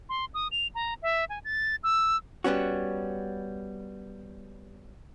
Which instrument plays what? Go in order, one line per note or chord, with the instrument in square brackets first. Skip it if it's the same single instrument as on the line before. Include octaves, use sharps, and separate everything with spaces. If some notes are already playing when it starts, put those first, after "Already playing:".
[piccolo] C6
D#6
F7
A#5
E5
G#5
A6
E6
[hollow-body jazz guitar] G3 B3 C#4 F#4